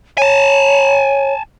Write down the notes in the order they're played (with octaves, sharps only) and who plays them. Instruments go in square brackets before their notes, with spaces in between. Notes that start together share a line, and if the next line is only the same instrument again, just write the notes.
[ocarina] C#5 [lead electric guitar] G#5 A5